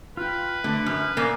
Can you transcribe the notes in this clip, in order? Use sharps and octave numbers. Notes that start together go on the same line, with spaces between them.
F4 B4 G5
D3 A3
F#2 F6
A#2 A#3